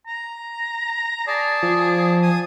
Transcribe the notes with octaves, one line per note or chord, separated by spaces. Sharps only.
A#5
G#4 D5 A5
F3
G#5 D#6